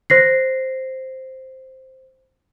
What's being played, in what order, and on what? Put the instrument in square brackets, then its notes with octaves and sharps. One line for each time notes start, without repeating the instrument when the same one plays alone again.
[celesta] C5 A#6 C7